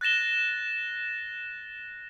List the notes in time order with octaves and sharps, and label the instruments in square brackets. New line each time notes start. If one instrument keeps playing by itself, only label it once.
[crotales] F#6 A6 A#6 E7 G7